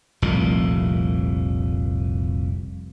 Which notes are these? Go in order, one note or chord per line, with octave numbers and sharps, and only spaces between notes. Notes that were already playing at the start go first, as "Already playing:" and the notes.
F1 C2 A#2